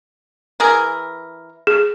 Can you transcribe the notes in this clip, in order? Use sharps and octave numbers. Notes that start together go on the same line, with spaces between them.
E3 G#4 A#4
G#4